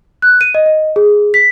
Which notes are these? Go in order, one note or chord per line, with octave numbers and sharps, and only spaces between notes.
F#6
D#7
D#5
D#5
G#4
B6